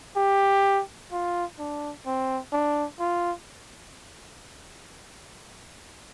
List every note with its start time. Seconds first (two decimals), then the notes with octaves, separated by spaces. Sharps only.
0.16 G4
1.12 F4
1.59 D4
2.06 C4
2.52 D4
2.99 F4